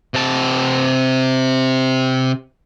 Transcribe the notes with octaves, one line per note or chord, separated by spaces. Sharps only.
C3 A5